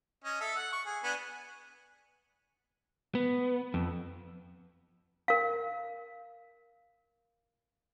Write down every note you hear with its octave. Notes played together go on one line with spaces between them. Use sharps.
C#4 D#5
A4 E5
F#5
C#6
G#4
B3 D4 G#5
B3
F2
A#4 F5